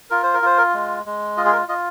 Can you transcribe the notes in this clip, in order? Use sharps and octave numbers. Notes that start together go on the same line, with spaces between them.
F4 A#4
C5
A#4
F4 C5
A#4
G#3
G#3
F4 D#5
G#4
A#4
F4 D#5